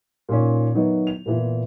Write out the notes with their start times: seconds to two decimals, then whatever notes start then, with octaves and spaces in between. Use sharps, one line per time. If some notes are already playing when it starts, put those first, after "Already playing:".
0.29 A#2 D#3 C#4
0.75 D#3 F#3 B3 D#4 E4
1.07 F7
1.26 A#2 E3 B3